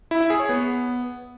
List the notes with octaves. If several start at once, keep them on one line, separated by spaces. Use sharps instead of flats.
E4
E5
G#4
C#5
B3